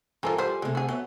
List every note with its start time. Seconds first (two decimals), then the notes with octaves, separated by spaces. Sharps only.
0.23 G2 E3 A#3 C4 F4 A4 A#4 G#5
0.38 F3 G3 G4 C5
0.62 D2 C3 G#3
0.75 F#4 G#4
0.89 F#3 B3 E5